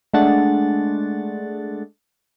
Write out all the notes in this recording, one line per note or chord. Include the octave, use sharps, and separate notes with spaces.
G#3 A3 D4 F#5 A6